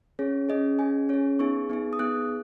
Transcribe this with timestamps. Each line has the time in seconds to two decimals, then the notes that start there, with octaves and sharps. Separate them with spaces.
0.19 C#4 G#4 C#5
0.49 C#4 G#4 D#5
0.79 C#4 G#4 G#5
1.09 C#4 G#4 C#5
1.39 B3 D#4 G#4 C#6
1.69 B3 D#4 G#4
1.93 D#6
1.99 B3 D#4 G#4 F#6